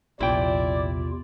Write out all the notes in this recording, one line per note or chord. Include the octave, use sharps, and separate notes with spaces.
A#1 E2 C3 E4 F4 D5 G5